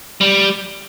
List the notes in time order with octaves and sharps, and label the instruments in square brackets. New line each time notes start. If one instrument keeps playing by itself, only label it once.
[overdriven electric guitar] G3